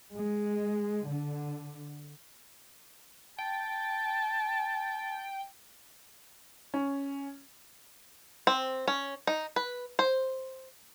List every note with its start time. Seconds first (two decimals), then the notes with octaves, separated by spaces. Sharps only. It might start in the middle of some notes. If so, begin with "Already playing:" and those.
0.15 G#3
1.08 D3
3.39 G5 A5
6.74 C#4
8.47 C4
8.88 C#4
9.27 D#4
9.56 B4
9.99 C5